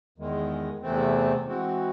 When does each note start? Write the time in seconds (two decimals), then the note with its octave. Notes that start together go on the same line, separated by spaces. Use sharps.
0.18 E2 D#3 G#3
0.82 E2 C3 E3 A3 C4
1.45 E3 G#3 C4 F#4